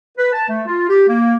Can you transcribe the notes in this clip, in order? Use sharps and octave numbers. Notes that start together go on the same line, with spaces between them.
B4
A5
A3
F4
G4
A#3